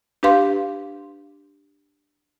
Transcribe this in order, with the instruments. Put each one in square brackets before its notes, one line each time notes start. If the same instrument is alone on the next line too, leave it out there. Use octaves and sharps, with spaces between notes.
[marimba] D4 G4 B4 F5 C6